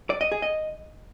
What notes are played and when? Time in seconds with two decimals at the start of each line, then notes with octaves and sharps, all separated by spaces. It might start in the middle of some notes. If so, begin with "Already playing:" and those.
0.10 D5
0.21 D#5
0.32 G#4
0.42 D#5